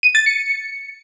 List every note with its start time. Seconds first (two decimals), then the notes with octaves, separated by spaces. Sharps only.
0.03 D#7
0.15 A6
0.26 C#7